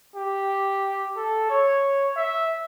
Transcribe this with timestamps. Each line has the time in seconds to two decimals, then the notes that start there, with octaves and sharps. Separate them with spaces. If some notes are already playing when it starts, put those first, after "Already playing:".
0.16 G4
1.16 A4
1.50 C#5
2.17 E5